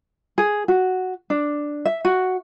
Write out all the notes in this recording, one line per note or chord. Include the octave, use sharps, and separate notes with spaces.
G#4
F#4
D4
E5
F#4